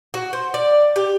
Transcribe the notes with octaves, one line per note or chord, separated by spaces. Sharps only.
F#4
C5
D5
G4